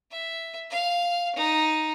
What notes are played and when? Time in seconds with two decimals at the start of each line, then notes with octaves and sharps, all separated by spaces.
0.11 E5
0.71 F5
1.36 D#4